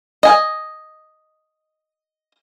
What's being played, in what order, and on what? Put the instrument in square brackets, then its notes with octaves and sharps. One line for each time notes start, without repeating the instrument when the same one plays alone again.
[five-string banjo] D#5 G#5